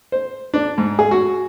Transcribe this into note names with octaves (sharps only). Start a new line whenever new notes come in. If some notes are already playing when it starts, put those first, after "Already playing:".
C5
D4
G#2
G#4
F#4